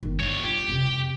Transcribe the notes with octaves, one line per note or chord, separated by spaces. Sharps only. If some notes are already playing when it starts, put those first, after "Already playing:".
G1 D#3
C2 D3 C#5
F4 G4
F2 C3